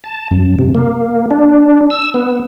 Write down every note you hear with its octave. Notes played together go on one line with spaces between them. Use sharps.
A5
F#2
C3
A#3
D4
E6
B3